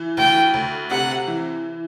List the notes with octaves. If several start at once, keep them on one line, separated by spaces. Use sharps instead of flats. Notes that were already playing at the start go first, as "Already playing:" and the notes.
Already playing: E3
D2 G5
D2
C3 F#5
E3